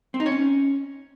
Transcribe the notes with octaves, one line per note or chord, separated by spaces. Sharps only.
C4
D#4
C#5
C#4